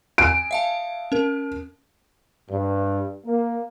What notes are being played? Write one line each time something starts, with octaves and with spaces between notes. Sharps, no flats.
G#5 D7
E5 F5 A5
C#4 A#4
G2
A#3